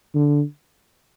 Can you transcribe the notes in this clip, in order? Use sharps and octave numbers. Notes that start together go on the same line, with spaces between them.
D3